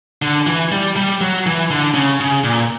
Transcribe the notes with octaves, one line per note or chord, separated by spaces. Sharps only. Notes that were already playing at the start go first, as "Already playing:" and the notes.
D3
E3
G3
G3
F#3
E3
D3
C#3
C#3
A#2